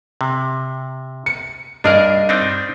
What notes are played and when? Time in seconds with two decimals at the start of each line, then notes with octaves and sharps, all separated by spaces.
0.21 C3
1.26 C#7
1.84 G2 D4 G#4 A#4 D#5 F6
2.29 C4 D4 D#4